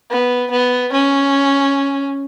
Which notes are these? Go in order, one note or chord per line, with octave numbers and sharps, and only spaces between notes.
B3
B3
C#4